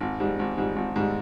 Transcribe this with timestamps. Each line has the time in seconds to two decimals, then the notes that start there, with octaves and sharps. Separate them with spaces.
0.01 G#1
0.20 G#2 G3
0.39 G#1
0.58 G#2 G3
0.76 G#1
0.96 G#2 G3